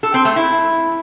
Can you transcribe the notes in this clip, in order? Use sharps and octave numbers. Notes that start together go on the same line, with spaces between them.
A4
C4
A3
E4